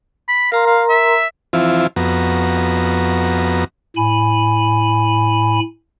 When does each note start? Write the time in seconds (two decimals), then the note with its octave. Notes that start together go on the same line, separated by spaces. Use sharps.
0.28 B5
0.52 A#4 F5 A#5 C6
0.67 F5
0.89 E5
1.53 E3 F3 C4 E4 F4
1.96 F2 B3 F#4 A#5
3.97 A2 G#5 B5